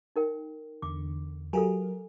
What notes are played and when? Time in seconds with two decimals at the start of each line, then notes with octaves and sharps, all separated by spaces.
0.16 D#4 A#4 G5
0.82 E2 D3 D6
1.53 F#3 G4 A4 A#4 F5 G#5